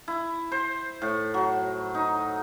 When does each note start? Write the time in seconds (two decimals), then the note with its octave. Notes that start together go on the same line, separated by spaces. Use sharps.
0.08 E4
0.52 C5
1.02 A2
1.34 F#3
1.94 D#4